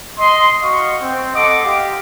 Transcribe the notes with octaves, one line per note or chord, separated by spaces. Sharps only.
D#5 C6
F#4 D#5 F5 C#6
C4
A4 D#5 F#5 C6 D6
G4 F5